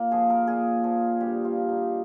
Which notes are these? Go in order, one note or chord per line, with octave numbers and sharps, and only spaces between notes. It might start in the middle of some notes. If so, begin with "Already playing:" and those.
Already playing: A#2 A#3
F3 G#4
A#4
A#2 G#4
F3
G2 G4
F4
F3
D#4